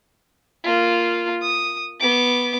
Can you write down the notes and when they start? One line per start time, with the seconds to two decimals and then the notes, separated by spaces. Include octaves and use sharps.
0.63 A#3 F4
1.42 D#6
2.00 B3 D6